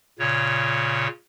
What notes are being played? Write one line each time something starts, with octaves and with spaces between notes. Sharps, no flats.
A#2 C#3 C#5